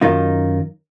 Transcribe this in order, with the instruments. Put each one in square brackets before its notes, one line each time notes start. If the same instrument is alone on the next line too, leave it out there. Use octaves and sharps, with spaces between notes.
[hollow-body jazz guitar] F#2 D#3 D#4 F4